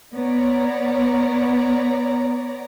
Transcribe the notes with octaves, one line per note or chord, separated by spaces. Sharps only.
B3 C#5 D5 A#5